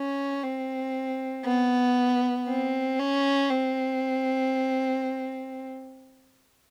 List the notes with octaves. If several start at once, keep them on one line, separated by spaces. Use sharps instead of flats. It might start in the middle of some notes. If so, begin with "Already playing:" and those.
Already playing: C#4
C4
B3
C4
C#4
C4